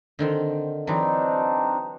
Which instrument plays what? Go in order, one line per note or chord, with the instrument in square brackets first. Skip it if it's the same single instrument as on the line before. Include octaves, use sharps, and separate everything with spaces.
[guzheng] D3 D#3 C4
[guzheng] E3 F#3 [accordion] C4 D4 D#4